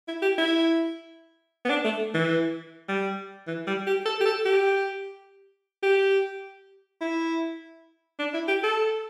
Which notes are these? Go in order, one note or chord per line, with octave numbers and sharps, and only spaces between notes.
E4
G4
E4
B3
D4
A3
E3
G3
E3
G3
G4
A4
G4
A4
G4
G4
E4
D4
E4
G4
A4